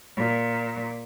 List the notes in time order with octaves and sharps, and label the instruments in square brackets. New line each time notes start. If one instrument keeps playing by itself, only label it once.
[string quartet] A#2